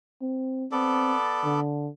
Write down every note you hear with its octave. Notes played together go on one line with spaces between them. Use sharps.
C4
B3 C4 A4 D5
D3